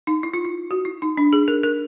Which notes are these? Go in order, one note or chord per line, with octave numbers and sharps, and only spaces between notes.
D#4
E4
F4
E4
F#4
E4
D#4
D4
G#4
A#4
A#4